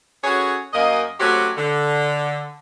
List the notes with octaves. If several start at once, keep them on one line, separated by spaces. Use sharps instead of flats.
C#4 F#4 G#4 A4 B4 C#5
F#2 A#3 D#5
F#3 A3 C4 C#4 F#4 G4
D3